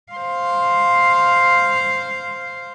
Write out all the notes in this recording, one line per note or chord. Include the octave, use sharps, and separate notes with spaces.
C5 F5